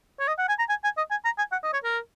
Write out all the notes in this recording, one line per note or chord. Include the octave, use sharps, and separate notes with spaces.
C#5
D#5
F#5
G#5
A#5
G#5
G#5
D#5
G#5
A#5
G#5
F#5
D#5
C#5
A#4